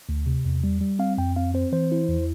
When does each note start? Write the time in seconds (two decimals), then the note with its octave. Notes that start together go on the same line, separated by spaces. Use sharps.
0.09 D2
0.26 C3
0.45 E2
0.64 G3
0.81 G3
0.99 C4 F5
1.18 F2 G5
1.36 C4 F5
1.54 C4 C5
1.72 E3 C5
1.92 E4
2.09 E2